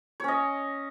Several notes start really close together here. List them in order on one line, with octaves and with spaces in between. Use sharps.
C#5 C#4 D#5